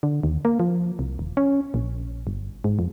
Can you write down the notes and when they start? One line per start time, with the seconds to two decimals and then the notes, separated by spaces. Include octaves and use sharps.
0.03 D3
0.23 D#2
0.45 A#3
0.60 F3
0.99 C2
1.19 D#1
1.37 C#4
1.74 A#1
2.27 G1
2.64 G#2
2.79 F2